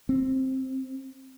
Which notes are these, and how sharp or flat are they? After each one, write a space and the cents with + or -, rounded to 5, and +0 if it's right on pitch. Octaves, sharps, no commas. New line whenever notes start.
C4 +10